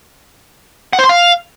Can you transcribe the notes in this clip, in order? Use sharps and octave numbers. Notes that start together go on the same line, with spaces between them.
F#5
C5
C6
F5